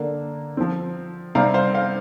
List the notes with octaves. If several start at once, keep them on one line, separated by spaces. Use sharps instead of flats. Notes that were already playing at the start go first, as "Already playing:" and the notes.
Already playing: D3 A#3 D4
F3 C4
C3 G3 C4 F5 A#5
C5 F5
C5 F5